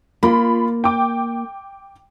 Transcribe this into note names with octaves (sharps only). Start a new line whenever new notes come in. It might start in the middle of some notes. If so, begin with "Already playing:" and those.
A#3 F4 B5
G5 D6